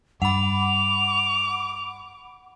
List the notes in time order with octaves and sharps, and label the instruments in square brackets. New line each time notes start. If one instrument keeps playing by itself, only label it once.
[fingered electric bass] G2 [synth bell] F#5 B5 [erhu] D6 [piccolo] F7